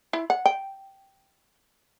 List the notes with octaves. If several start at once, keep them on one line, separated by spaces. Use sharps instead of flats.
E4
F#5
G5